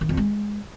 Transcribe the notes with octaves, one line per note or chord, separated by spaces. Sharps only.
D#3
F2
G#3